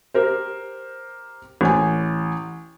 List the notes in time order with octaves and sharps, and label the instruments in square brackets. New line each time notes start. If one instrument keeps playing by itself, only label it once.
[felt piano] G4 A#4 C5
A1 G#5